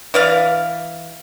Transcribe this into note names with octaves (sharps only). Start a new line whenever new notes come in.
E3 D5 F5